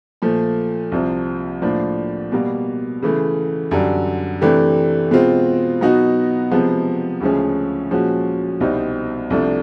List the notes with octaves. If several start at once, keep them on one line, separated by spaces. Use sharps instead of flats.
A#2 F3 A3
C2 C3 F3
A2 F3 A#3 D4
B2 G3 A#3
C#3 E3 A3
F#2 D3 G3
C3 E3 A3 D4 G4
B2 G#3 C4 F4
B2 F#3 B3 D#4 F#4
C3 F3 G#3 B3
D2 C#3 F3 G#3 C#4
A#2 F3 G#3 C#4 F#4
C2 B2 G3 C4 D#4
C2 C3 F3 A3 D4